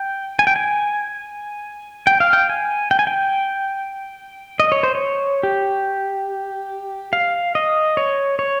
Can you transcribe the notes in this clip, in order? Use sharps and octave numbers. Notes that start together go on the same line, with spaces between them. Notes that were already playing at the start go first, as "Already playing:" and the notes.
Already playing: G5
G#5
G5
G#5
G5
F5
G5
G#5
G5
G#5
G5
D#5
C#5
C5
C#5
G4
F5
D#5
C#5
C#5